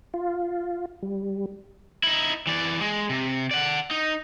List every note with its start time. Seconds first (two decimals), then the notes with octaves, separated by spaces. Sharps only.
0.14 F4
1.02 G3
2.03 D#4 E4
2.47 E3 D5
2.81 G#3
3.09 C3
3.51 D5 F#5
3.91 D#4